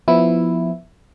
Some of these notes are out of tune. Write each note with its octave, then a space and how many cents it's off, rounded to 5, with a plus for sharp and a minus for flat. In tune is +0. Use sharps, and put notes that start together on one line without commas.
F3 +0 B3 +0 E4 +0